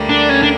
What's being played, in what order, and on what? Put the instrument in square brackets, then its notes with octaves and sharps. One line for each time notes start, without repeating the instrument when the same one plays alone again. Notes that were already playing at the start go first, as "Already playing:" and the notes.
Already playing: [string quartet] D2 D3 G3 A#3
[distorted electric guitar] D4
C#4
D4